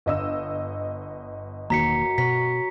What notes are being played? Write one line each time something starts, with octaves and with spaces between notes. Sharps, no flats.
G1 D#5 E6
E1 D#3 F#3 A#3 A#4 A#5 B6 C#7
B2 C#5 F#5 A#5 B6